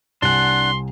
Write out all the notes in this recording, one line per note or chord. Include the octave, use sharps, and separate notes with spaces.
C2 D4 F#5 G#5 C6